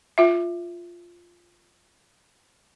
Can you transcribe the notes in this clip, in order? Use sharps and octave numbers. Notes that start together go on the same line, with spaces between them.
F4 E5